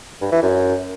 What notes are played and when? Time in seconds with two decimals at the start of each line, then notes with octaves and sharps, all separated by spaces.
0.21 G2
0.32 E3
0.42 F#2